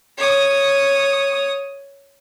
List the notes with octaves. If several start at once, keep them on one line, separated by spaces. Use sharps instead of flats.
C#5 D#6